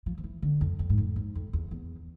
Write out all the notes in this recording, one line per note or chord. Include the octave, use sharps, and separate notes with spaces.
F3
F3
E3
D3
F2
F2
G#2
F2
G#2
F2
E2
E2